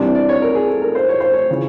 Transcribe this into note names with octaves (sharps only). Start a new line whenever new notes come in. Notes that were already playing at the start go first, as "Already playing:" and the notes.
Already playing: C2 C3 E3 D4
D5
C#5
A#4
G#4
A4
A#4
C5
C#5
C5
C#5
C#3 E3